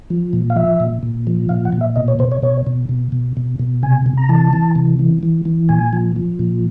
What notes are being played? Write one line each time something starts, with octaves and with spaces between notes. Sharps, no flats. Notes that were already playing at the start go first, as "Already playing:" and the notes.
F3
A#2
F5
F3 E5
A#2
A#2
F3
A#2 F5
F#5
A#2
E5
B2 D#5
C#5
B2 C5
C#5
B2 C#5
B2
B2
B2
B2
B2
C3 G#5
C3
A#5
E3 A5
E3
C3
E3
E3
E3
A#2 G#5
F3
F3
A#2